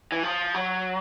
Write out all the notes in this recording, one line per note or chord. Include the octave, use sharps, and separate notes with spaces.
E3
F3
F#3